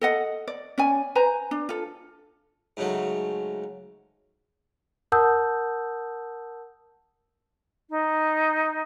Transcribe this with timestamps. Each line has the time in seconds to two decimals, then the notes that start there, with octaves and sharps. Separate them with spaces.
0.01 A4 D#5 F#5
0.48 D5
0.78 C#4 D5 G#5
1.15 B4 C5 G#5 A#5
1.51 D4
1.69 F4 A4
2.77 G#2 C#3 F#3 A3
5.12 A#4 F#5 A5 D#6 E6 G6
7.90 D#4